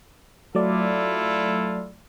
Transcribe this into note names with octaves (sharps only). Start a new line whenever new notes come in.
F#3 A3 E4 F4 A4 D5